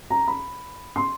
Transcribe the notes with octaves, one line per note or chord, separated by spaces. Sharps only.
A#5
B5
C6